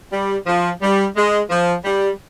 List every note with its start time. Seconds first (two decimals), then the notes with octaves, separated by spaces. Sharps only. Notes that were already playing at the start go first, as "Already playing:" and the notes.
0.12 G3
0.46 F3
0.82 G3
1.16 G#3
1.50 F3
1.84 G3